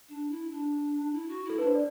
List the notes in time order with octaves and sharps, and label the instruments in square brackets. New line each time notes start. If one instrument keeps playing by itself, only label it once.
[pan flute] D4
E4
D4
E4
F#4
[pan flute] E4 [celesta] A4
[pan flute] D4 [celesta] B4
[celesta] C5
D5